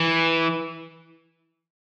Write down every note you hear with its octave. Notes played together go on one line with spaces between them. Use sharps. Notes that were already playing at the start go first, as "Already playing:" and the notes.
Already playing: E3